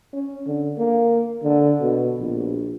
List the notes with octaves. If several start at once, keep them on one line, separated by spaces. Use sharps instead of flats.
C#4
D3
A#3
D3
B2
A#1